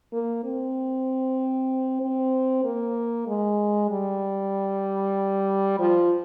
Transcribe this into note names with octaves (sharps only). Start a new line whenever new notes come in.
A#3
C4
C4
A#3
G#3
G3
F3